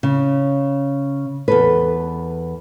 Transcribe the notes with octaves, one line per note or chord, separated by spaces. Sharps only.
C#3
E2 A4 B4